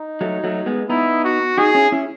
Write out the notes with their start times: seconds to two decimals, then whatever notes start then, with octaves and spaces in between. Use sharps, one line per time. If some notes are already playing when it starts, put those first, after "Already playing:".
Already playing: D#4
0.21 F#3 A3
0.44 F#3 A3
0.66 G#3 B3
0.89 B3 D#4 E4
1.24 F#4
1.58 D#4 F#4 G#4
1.75 C#4 E4
1.92 C#4 E4